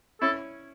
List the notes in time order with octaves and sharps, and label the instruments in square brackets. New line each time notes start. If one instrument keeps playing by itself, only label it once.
[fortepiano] C#4 E4 [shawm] A4